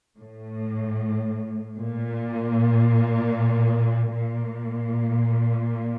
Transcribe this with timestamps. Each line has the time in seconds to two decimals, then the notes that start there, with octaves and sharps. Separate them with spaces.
0.18 A2
1.77 A#2
4.15 A#2